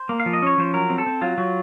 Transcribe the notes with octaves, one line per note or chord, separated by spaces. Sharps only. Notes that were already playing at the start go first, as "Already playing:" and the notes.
Already playing: C5
A#3
F5
F3
D#5
C#4 C#5
F3 C5
F#3 A#4
C4
A4
C4
F#3 F4
F#3